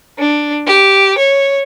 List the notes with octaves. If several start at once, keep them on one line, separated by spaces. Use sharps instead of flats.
D4
G4
C#5